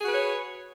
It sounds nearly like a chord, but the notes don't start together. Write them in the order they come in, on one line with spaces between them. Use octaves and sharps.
G#4 F#4 B4 C#5